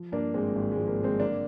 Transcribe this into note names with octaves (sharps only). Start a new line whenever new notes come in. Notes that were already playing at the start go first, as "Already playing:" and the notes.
Already playing: F3
G2 A#3 D4
G#1 G#3 C4
G#1
G#3
F3
A#3
G2
G#3 C4
D3 A#3 D4